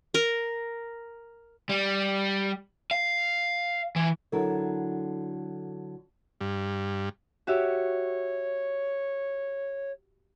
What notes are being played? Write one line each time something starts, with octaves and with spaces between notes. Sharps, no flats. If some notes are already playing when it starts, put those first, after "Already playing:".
A#4
G3
F5
E3
D3 F#3 E4 A4 A#4
G2
F#4 G4 C#5 E5